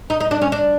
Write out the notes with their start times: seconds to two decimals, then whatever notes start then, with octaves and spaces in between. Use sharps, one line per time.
0.10 D#4
0.20 D#4
0.31 D4
0.42 C#4
0.52 D4